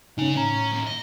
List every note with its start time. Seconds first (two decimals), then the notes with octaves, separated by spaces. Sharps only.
0.18 C#3 C#4 D#4 G#5
0.36 A2 C#4 C#5 A#5
0.72 D#2
0.87 D#5